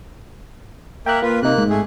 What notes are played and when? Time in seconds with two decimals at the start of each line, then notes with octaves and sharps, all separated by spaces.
1.06 A#3 A#4 E5 G5 F#6
1.22 A#3 F4 B4
1.43 C3 A#3 D#4 F#6
1.58 G#2
1.70 A3 G#4